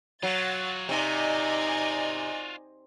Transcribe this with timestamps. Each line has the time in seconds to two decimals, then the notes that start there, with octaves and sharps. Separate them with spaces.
0.23 F#3 F4 F#4 F#5 A6
0.89 C3 D#4 D5 D#5 G#5